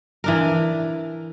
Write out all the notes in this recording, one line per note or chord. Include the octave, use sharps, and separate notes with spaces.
E3 D4 A#4